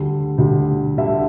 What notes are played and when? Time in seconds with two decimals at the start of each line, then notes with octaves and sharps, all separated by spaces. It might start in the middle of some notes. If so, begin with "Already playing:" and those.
Already playing: D2 D3 G3
0.38 D2 D3 G3
0.98 D2 D3 G3 E5